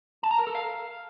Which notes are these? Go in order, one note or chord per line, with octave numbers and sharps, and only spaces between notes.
A5
A#5
A#4
A4
F5